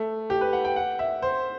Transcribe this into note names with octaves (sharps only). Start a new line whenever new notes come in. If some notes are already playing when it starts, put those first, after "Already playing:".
Already playing: A3
G4
B4
F#5
G5
F#5
E5
C5